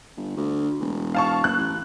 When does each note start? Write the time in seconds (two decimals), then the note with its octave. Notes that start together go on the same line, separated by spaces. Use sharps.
0.17 G1
0.37 D2
0.80 E1
1.15 F5 A5 C#6
1.44 F#1 F#6
1.57 A1